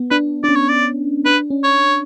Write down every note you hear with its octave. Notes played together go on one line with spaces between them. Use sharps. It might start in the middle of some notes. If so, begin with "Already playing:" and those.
Already playing: B3
D4 B4
D4 D5
C#4
C#5
D5
D4 B4
C#4
C#5